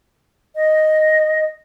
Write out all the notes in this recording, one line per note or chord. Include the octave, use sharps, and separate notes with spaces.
D#5